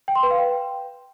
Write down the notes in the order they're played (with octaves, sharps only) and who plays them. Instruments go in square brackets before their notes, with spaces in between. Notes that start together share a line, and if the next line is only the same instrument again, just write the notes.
[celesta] G5
C6
B4
F5
G5